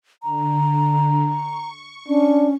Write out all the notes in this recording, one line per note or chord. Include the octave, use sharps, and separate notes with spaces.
D3 A#5
C#6
C#4 D4